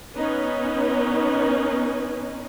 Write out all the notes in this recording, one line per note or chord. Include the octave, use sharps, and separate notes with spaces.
B3 C#4 D#4 B4